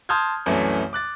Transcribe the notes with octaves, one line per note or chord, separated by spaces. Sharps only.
A5 C6 D#6 F6 G6 G#6
C2 F#2 E3 F#3 A3
D6 F#6 A6